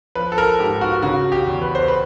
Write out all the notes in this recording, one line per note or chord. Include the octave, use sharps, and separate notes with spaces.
F3 B4
A4
A#4
G#2 G4
F#4
C#3 F#4
G4
E2
B4
C5
B4